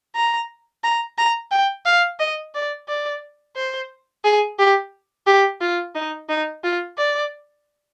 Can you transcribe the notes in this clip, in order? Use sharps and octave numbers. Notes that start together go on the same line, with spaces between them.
A#5
A#5
A#5
G5
F5
D#5
D5
D5
C5
G#4
G4
G4
F4
D#4
D#4
F4
D5